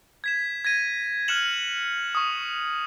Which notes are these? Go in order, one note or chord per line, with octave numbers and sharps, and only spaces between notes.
G#6 B6 E7
G#6 A#6 D#7
F6 F#6 G#6 C#7 E7 F#7
C#6 D#6